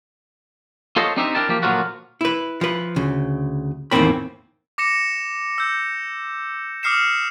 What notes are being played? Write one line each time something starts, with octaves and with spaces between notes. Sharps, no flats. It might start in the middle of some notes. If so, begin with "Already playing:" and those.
F4 A4 C5 C#5 D#5
C4 D4 D#4 G4 C5 E5
D4 E4 A#4 G5 A5
F3 A#3 G4
A#2 D3 F3 F#3 F4 F#4
E4 B4
F3 B4
D2 C#3
E2 A2 D#3 A#3 C4 B5
D6 A#6 C#7 E7
E6 G6
D6 D#6 F6 C7 C#7 E7